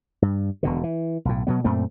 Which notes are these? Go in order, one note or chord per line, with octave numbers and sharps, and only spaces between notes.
G2
E1 B2 D3
E3
B1 A2
B2 F#3 B3
F#2 A#2 A3 C4